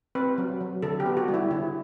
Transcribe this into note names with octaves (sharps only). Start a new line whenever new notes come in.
C4 B4
F#3
F#3
D3 A4
G4
B3
F#4
G3
E4
D3 E4